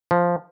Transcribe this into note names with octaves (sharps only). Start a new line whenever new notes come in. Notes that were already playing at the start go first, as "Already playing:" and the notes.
F3